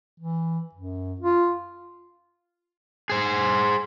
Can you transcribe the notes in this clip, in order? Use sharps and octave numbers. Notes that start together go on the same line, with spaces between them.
E3
F#2
F4
G#4 C5